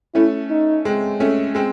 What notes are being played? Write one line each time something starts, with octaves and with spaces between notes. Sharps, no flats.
A3 C#4 E4
D#4
G#3 C4
A3 C#4
G#3 C4